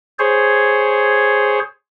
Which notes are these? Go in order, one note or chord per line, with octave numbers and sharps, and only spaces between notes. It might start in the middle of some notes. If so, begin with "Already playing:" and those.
G#4 C5 C#5